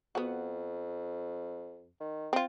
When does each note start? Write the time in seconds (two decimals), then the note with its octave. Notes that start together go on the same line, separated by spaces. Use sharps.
0.15 F2 B3 F#4
2.00 D#3
2.33 C4 F4